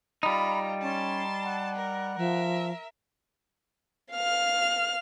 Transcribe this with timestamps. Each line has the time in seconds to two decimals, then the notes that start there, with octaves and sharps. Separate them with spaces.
0.23 G3 D#4 F4 A#5 B5
0.82 C#4 A5 C6
1.44 F#5
1.76 A#4
2.17 F3 A#4 E5
4.12 F5 F6